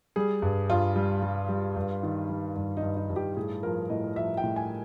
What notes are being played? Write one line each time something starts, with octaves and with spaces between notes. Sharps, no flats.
G3 G#4
G2
G2 F4
G3
G3
G3
G2
D#3
G3
G2
D#4
G2
D#4
G2
G4
A2 G#4
F3 A#4
A2 D#5
F3 E5
G5
A2
G#5